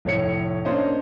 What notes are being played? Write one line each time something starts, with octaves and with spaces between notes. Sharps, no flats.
F1 A2 C#5 C#7
A#3 C#4 D4 C5 C#5 D#5